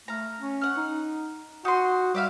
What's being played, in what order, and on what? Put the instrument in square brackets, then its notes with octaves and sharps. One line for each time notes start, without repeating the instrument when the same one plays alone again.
[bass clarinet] A3 [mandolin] F5 A#5
[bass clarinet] C#4
[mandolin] F#5 F6
[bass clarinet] D#4
[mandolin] D#4 C6 [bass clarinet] F#4
[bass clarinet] G3 [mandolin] D5 E5 F5